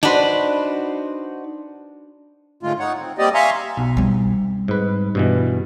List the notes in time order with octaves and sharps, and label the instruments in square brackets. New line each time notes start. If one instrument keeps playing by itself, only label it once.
[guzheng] D4 B4 [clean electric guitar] D#4 F#4 C5
[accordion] G#2 D3 G#3 A3 F4
D#4 C#5 F#5
C4
G3 A#3 C4 G4 D5 D#5
E5 F5 G#5 A#5 C6 C#6
[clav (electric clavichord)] B1
[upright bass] G3 C4
[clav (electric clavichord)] G#2 B4
G2 B2 E3